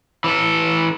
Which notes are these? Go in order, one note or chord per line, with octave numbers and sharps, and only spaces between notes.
E3 A4